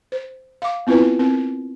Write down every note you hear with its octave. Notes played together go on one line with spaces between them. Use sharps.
C5
F5 D6
B3 C4 E4 F4 B4
C4 A#4